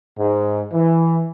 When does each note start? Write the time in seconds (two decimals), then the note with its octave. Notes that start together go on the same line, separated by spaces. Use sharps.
0.19 G#2
0.73 E3